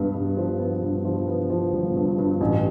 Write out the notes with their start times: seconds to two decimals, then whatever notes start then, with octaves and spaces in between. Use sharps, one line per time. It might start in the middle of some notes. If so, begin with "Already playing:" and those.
Already playing: G2 B3
0.14 G2
0.37 F3
0.59 B3
0.82 G2
1.05 F3
1.27 B3
1.50 F3
1.73 G1
1.95 G2
2.18 G2
2.41 A1